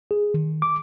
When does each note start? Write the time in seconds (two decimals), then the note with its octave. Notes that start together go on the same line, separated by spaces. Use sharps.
0.11 G#4
0.34 D#3
0.62 D6